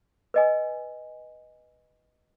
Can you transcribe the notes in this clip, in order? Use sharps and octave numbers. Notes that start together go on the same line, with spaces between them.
B4 D#5 G#5